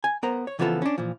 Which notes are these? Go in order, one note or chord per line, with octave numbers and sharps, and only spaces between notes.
G#5
B3 A#4 C5 A#5
C#5
C#3 E3 F3 B3 F4 A4
C#4 D4
A#2 E3 F3